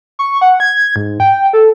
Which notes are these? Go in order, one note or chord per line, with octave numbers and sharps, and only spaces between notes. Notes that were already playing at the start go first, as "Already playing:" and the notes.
C#6
F#5
G#6
G#2
G5
A4